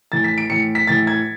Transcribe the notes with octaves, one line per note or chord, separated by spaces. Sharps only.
A2 E3 A6
B6
D7
A2 E3 C#7
B6
A2 E3 A6
G#6